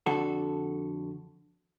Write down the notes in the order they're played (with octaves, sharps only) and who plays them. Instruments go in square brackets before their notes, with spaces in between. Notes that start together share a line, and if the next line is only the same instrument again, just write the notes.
[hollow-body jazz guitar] F2 D3 F#4 A4